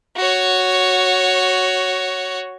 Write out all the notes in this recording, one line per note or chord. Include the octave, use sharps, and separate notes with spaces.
F#4 C#5